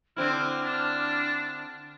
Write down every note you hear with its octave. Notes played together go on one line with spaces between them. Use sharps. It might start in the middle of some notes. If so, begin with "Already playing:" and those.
D3 C4 E4 F6
D4